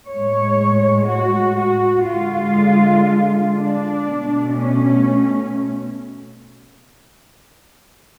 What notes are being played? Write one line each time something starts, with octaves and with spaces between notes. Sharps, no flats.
A2 G#3 C#5
F#4
F#4
D3 G#3 F4
D4
B2 A3
C#4